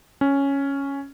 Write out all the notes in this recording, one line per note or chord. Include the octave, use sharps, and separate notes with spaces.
C#4